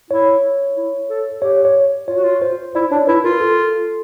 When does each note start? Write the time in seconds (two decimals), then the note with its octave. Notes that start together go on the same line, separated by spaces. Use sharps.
0.11 E4 C#5
0.77 E4
1.09 A4
1.42 G4 C#5
1.65 C#5
2.08 F4 C#5
2.17 F#4
2.24 F4
2.42 C5
2.75 E4 D5
2.92 D4 C#5
3.07 E4 B4
3.24 F4 A#4
3.40 A4